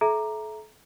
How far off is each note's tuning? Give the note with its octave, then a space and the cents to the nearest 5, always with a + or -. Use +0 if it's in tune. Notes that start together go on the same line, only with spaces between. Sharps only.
A4 -35 E5 +0 A#5 +0